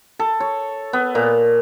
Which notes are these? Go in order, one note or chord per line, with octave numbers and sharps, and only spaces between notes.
A4
C#5
B3
A#2